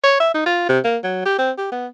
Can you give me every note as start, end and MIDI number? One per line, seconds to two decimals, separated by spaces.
0.04 0.19 73
0.20 0.31 76
0.35 0.45 63
0.46 0.66 65
0.69 0.79 48
0.84 0.97 58
1.03 1.21 54
1.25 1.38 67
1.38 1.51 60
1.58 1.67 67
1.72 1.87 59